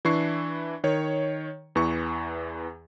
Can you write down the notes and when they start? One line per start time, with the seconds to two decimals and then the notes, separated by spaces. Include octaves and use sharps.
0.05 E3 D4 E4 C#6 C7
0.84 D#3 C#5
1.75 E2 E3 C#6